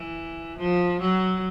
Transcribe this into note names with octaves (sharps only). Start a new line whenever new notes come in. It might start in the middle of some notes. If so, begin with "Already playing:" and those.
Already playing: E3
F3
F#3